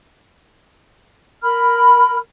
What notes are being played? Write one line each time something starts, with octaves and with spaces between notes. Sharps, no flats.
A#4 B5 F6